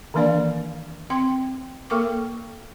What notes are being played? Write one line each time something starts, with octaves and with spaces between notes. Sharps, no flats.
D#3 E3 A#3 D4 D5 F5
C4 G5 C6
A#3 A4 A#4 G5 C#6 D6